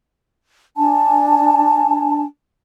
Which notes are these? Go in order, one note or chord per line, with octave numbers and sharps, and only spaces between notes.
D4 G#5 A5